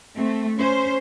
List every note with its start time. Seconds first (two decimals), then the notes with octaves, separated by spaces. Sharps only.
0.16 A3 C4
0.57 C#4 C5